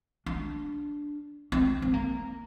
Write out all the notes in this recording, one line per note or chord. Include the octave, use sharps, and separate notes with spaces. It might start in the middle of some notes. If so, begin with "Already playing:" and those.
D4
C4
C4
A#3